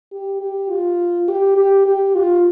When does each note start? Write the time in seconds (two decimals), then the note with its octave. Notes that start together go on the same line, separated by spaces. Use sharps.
0.12 G4
0.41 G4
0.70 F4
1.28 G4
1.56 G4
1.86 G4
2.15 F4